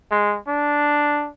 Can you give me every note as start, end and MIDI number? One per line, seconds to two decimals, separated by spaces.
0.11 0.37 56
0.47 1.29 62